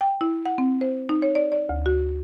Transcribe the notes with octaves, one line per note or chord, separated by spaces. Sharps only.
G5
E4
F#5
C4
C5
D#4
C#5
D5
D5
D2
F#4